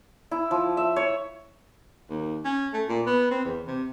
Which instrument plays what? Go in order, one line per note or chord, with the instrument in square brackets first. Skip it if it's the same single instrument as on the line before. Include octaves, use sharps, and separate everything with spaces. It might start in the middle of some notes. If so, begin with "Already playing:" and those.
[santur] E4
F3
E5
C#5
[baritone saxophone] D#2
C#4
A3
A#2
B3
C4
E2
C3